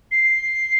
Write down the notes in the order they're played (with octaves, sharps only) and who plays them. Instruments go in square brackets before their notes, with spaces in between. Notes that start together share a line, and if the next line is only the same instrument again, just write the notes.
[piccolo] C7